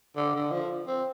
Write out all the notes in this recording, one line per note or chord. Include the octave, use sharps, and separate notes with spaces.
D3
D3
F3
C4